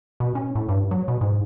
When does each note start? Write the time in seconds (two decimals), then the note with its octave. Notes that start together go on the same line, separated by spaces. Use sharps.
0.20 B2
0.35 C#4
0.55 A2
0.69 G2
0.91 F#3
1.08 B2
1.21 G#2